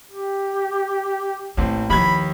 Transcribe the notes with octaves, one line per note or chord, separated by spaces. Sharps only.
G4
A1 A#3 C4
D#2 E3 F3 B5 G#6